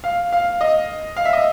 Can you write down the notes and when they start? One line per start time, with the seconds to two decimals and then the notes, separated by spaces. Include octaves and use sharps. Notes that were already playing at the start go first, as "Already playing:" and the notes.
0.04 F5
0.32 F5
0.61 D#5
1.16 F5
1.25 E5
1.33 D#5